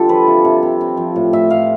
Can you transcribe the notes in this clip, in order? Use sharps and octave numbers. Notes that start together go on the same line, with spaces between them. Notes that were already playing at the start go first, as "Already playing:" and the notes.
Already playing: D3 G3 F4 G4 A4
F3 B4
C3
C3
C3
C4
F3
A2
A2 E5
A2 F5